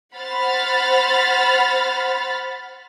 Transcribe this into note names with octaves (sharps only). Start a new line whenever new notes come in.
C5 F#5 B5 F6 A6